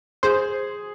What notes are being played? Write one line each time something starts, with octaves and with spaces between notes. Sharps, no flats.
G#4 C5